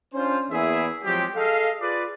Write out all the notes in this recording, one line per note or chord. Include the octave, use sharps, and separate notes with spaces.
C#4 D4 F4 C5
E2 A#3 E4 G#4 E5
F3 F#3 G#3 C4 G4
G#4 A4 D#5 F5
F4 G#4 B4 D5